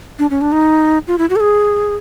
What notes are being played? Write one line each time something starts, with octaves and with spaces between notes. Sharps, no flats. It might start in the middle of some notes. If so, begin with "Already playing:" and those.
D4
C#4
D4
D#4
F4
E4
F#4
A4
G#4